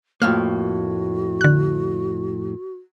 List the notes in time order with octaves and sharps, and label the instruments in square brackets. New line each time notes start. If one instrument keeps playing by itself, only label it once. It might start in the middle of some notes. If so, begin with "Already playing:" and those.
[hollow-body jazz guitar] F2 A2 A#3 [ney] F#4 [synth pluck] F6
[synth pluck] D3 F#6